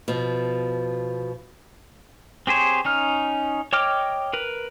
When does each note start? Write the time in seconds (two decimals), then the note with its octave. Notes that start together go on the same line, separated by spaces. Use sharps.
0.08 B2 F3
2.47 C4 G4 G#4 C5 C#5
2.85 C#4 D#4 F6
3.73 C#5 D#5 G5 D6 F6
4.33 A#4 B4